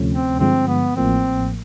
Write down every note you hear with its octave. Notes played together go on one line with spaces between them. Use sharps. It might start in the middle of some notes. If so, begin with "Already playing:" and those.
Already playing: D2 C3 F3 A3 C#4
C4
G2 D3 F3 G#3 C4
B3
A1 A2 F3 A#3 C4